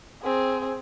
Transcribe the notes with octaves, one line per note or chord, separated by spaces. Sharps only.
C4 G#4